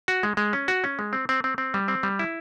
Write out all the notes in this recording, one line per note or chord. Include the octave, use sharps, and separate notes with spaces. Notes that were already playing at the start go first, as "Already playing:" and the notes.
F#4
G#3
G#3
C#4
F#4
C#4
G#3
C4
C4
C4
C4
G3
C4
G3
E4